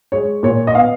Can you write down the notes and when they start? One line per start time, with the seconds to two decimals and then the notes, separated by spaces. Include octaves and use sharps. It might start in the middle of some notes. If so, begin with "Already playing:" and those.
0.12 G#3 C#5
0.43 A#2 C#5
0.67 D#5
0.75 B3 F5